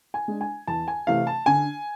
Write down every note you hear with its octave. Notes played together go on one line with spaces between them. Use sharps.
G#5
G#3 D4
G#5
E2 A5
G#5
C3 E3 A3 F5
A5
D3 G#5